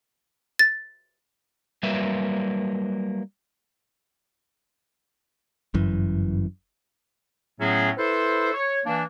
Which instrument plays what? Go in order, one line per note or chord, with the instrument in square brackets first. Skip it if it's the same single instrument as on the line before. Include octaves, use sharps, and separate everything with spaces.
[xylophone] A6
[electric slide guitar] F#3 G3 A#3 B4 E5
[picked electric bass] G1 F#2 E3
[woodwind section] A2 F#3 A3 B3 C#4 G#4
E4 A4 B4 C5
C#5
E3 A#3 D4